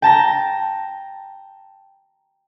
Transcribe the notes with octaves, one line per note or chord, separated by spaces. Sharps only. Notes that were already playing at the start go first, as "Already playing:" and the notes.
G5 A5 A#5 A#6